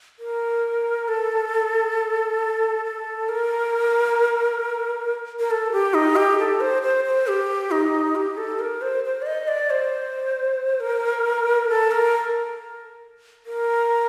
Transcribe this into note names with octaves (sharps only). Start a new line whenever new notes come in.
A#4
A4
A4
A#4
A#4
A4
G4
D#4
G4
A4
C5
C5
C5
G4
D#4
G4
A4
A#4
C5
C5
D5
D#5
D5
C5
A#4
A4
A#4
A#4